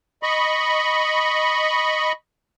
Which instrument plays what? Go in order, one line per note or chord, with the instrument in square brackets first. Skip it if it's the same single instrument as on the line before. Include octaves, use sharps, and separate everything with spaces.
[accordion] D#5 B5 C#6